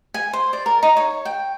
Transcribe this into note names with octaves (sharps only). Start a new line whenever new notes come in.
G#5
C5
D5
A#4
D#4
C#5
G5